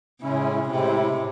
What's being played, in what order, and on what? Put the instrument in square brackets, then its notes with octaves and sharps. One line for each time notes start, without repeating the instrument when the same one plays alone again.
[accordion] A2 G#3 C#4 E4 [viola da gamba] C#3
[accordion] A2 G#3 C4 E4 [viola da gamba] C3
[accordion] A2